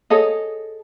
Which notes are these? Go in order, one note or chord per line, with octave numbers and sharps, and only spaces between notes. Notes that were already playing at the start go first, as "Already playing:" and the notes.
G#4 A4 C#5 D#5